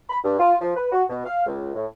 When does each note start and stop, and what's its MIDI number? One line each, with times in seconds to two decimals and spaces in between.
0.10 0.19 83
0.24 0.37 43
0.39 0.54 65
0.61 0.76 53
0.76 0.90 71
0.92 1.04 66
1.09 1.22 47
1.26 1.45 77
1.46 1.75 37
1.75 1.86 45